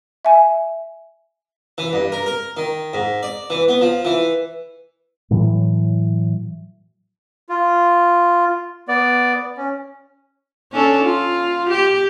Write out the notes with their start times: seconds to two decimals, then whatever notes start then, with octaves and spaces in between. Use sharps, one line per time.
0.25 E5 G#5
1.78 E3
1.93 G2
2.12 A#4
2.26 A#4
2.57 D#3
2.94 G#2
3.23 D5
3.50 E3
3.69 B3
3.81 F3
4.05 E3
5.31 A2 E3 F#3
7.49 F4
8.88 B3 D5
9.57 C#4
10.73 C#4 D4 A4
11.03 F4
11.69 G4